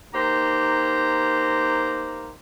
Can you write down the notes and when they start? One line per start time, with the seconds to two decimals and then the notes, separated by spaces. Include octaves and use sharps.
0.14 A#3 D#4 G4 C5 A#5